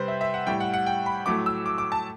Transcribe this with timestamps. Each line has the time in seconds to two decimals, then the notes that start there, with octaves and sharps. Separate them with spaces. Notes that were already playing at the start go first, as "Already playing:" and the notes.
Already playing: C3 G3 B4 C5
0.08 E5
0.21 E5
0.34 F#5
0.47 A2 G3 G5
0.60 F#5
0.74 F#5
0.86 G5
1.06 B5
1.26 A2 F#3 A3 D6
1.46 E6
1.66 D6
1.78 D6
1.92 A5